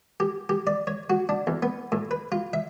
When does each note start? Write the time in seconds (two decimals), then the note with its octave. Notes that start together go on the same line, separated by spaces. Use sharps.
0.20 G4
0.49 G4
0.67 D5
0.87 C#5
1.10 F#4
1.29 D4
1.47 E2
1.63 B3
1.92 A2
2.11 B4
2.32 F4
2.53 E5